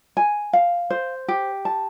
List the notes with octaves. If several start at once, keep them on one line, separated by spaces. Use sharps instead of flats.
G#5
F5
C5
G4
A5